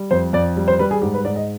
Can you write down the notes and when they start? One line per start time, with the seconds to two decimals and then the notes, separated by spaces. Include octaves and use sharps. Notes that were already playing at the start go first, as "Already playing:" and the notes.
Already playing: G3
0.11 F2 C5
0.33 F2 D5
0.57 G3
0.68 C5
0.79 G3 B4
0.91 G#4
1.02 G#2 G4
1.14 B4
1.25 G#2 D5
1.36 D#5